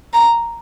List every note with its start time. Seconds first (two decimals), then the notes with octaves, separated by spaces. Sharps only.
0.14 A#5